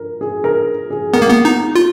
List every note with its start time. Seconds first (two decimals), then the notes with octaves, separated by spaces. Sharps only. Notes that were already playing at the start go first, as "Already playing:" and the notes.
Already playing: A#4
0.21 G#4
0.44 A#4
0.90 G#4
1.14 B3 A#4
1.22 A#3
1.30 B3
1.45 D#4
1.75 F4